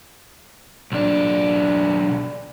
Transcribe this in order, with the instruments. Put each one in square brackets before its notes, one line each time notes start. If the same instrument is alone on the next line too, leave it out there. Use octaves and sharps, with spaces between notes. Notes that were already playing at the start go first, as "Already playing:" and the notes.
[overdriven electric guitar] B1 D4